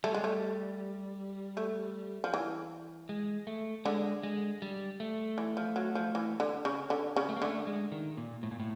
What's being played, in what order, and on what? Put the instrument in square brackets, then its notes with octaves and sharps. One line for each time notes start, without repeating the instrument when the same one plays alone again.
[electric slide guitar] G3 [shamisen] A3
[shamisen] G#3
A3
A3
F3
E3
[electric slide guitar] G#3
A3
[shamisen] D3 [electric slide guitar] G#3
[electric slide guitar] G#3
G3
A3
[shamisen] E3
F3
F#3
F3
E3
D3
C#3
D3
C#3
[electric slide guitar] A3
A#3
[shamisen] D3 [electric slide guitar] A3
[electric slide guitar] G#3
D#3
A#2
A2
A#2
A2